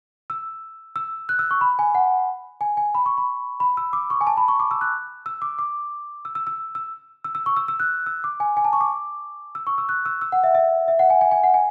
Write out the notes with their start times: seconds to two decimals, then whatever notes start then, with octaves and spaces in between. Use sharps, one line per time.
0.30 E6
0.96 E6
1.29 F#6
1.39 E6
1.51 C#6
1.61 B5
1.79 G#5
1.95 F#5
2.61 G#5
2.77 G#5
2.95 B5
3.06 C#6
3.18 B5
3.60 B5
3.77 E6
3.93 D6
4.10 C#6
4.21 G#5
4.27 A5
4.37 B5
4.48 C#6
4.60 D6
4.71 E6
4.81 F#6
5.26 E6
5.42 D6
5.59 D6
6.25 E6
6.35 E6
6.47 E6
6.75 E6
7.24 E6
7.35 E6
7.46 C#6
7.57 E6
7.68 E6
7.80 F#6
8.06 E6
8.24 D6
8.40 G#5
8.57 G#5
8.65 A5
8.73 C#6
8.81 D6
9.55 E6
9.67 C#6
9.78 E6
9.89 F#6
10.06 E6
10.21 E6
10.32 F#5
10.44 E5
10.55 E5
10.88 E5
10.99 F#5
11.10 G#5
11.21 G#5
11.32 G#5
11.44 F#5
11.54 G#5